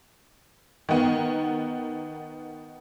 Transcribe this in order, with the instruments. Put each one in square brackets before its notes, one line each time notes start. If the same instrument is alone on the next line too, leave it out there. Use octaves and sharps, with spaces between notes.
[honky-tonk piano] D#3 B3